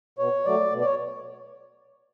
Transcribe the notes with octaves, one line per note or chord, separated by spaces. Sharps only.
B2 C#5
F#3 A3 D5
B2
D5
C#5